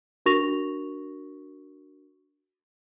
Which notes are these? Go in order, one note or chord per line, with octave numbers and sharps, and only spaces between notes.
D4 F#4 A#4 C#6 A#6 F7